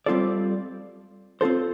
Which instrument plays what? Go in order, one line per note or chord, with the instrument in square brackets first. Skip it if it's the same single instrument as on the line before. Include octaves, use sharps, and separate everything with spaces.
[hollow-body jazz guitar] G3 C4 F4 A4 D5
C4 F4 A4 C5